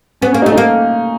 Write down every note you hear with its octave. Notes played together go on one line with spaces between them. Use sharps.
B3 C#4
A#3 C#4
D#4
A3
D#4
A#3